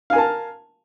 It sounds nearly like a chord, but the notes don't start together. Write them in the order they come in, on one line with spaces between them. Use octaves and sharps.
F5 G#5 A#4 A5